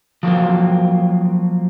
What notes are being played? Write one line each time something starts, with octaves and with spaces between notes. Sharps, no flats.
F3 F#3 A#3 C4